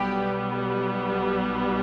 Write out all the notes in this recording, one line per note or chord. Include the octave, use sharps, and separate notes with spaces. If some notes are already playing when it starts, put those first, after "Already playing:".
Already playing: B1 B2 G3 B3 G4